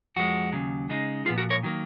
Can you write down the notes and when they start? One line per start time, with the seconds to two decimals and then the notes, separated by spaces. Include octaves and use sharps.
0.16 F2 F3 G#3 F#4
0.52 D#2 C#3 F#3
0.89 C#3 G#3 D#4
1.25 A#2 F3 G#3 B3 D#4 F4 G#4
1.38 F#4 A#4
1.50 A#4 C#5
1.63 D#3 F#3 A#3